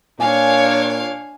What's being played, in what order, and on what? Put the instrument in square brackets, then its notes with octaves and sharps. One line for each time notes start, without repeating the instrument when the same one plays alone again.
[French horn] A#2 [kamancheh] D4 C#5 [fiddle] F5 [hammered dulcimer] G#5